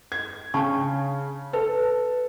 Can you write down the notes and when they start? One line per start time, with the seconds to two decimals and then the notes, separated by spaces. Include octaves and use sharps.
0.12 G#6
0.54 C#3 D4 A5 C#6
1.53 A4 B4